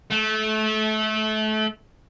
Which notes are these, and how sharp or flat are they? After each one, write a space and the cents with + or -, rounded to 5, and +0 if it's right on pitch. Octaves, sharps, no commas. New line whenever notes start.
A3 -25